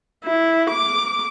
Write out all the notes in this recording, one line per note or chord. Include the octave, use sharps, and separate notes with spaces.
E4
D6